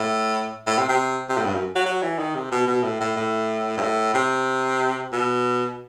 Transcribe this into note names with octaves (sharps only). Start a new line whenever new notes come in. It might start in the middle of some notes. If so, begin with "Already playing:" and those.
Already playing: A2
A2
C3
C3
C3
A2
G2
F#2
F#3
F#3
E3
D#3
C3
B2
B2
A2
A2
A2
G2
A2
C3
B2